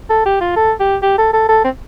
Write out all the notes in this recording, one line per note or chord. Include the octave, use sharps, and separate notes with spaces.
A4
G4
F4
A4
G4
G4
A4
A4
A4
C4